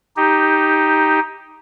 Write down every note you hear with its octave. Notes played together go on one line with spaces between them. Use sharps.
D#4 G4